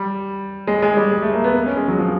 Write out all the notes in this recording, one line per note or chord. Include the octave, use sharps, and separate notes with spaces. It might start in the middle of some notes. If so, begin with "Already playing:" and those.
Already playing: G3
G#3
G#3
G3
G#3
A3
A#3
B3
C#4
G#3
F#3
F3